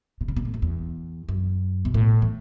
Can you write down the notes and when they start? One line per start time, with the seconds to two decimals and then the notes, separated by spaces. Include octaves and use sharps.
0.21 B2
0.28 C#3
0.36 B2
0.45 A2
0.54 F#2
0.62 E2
1.29 F#2
1.85 B2
1.94 A2
2.22 E3